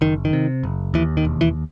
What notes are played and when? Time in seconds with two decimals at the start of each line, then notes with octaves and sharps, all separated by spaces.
0.01 F#1 D#3
0.25 D#3
0.33 C3
0.63 F#1
0.94 D#2 E3
1.17 D#3
1.25 E1
1.41 E3